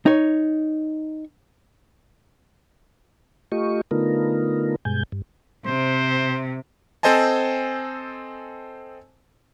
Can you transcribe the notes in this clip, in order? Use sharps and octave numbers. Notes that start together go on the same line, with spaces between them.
D#4 C#5
A3 F4 G4 D#5 C#6
D3 A3 B3 D#4 F4 A#4
G2 B2 G#3 G#5 G6
G2
C3 C5
C4 A4 C5 D#5 G#5 A5